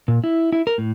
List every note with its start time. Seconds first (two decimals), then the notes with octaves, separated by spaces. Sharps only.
0.08 A#2
0.24 E4
0.52 E4
0.67 A#4
0.78 A2